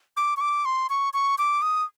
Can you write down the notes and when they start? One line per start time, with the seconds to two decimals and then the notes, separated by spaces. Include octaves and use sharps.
0.17 D6
0.37 C#6
0.41 D6
0.65 C6
0.90 C#6
1.14 C#6
1.38 D6
1.62 D#6